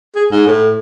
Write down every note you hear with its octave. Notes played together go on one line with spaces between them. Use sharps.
G#4
G#2
A2